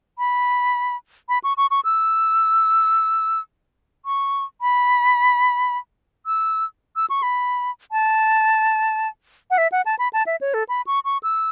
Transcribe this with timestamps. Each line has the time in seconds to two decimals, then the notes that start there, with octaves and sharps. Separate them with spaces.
0.19 B5
1.29 B5
1.44 C#6
1.57 C#6
1.71 C#6
1.85 E6
4.06 C#6
4.61 B5
6.26 E6
6.96 E6
7.10 C#6
7.23 B5
7.92 A5
9.51 F#5
9.58 E5
9.72 F#5
9.86 A5
9.99 B5
10.13 A5
10.26 E5
10.41 C#5
10.54 A4
10.69 B5
10.87 C#6
11.05 C#6
11.23 E6